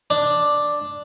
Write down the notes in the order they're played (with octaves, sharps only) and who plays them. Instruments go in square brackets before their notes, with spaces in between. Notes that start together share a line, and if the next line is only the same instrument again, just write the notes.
[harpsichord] D4